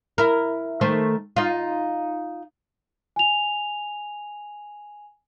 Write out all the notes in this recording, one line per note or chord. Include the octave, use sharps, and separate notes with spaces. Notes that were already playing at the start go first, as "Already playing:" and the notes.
E4 A#4
D#3 A3 C5
D#4 F4
G#5 F7